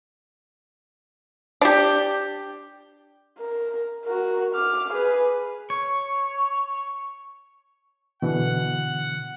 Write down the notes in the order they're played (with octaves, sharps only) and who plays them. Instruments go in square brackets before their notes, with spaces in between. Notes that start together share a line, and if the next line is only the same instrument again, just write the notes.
[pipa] D4 G4
[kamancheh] A#4
F#4 A#4
D6 F6
G#4 B4
[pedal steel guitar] C#5
[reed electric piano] B2 D3 E3 [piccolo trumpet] F#5